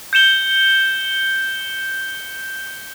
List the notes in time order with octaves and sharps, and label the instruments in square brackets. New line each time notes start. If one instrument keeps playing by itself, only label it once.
[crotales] G6 C#7 E7 G7